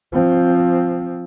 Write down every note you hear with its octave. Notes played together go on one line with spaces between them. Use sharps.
F3 C4